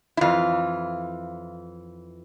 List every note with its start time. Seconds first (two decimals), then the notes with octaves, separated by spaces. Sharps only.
0.17 E4
0.21 F2 E3 F4